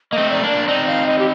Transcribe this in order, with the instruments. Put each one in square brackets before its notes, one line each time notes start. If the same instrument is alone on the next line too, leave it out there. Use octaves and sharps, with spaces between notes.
[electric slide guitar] A#3 [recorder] D#5
[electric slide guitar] A3 C4
[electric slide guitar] D#4 [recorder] D5
[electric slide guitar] A#3 D4
[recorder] D5
[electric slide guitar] C4 D#4 [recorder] D5
[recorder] F5
D#5
G4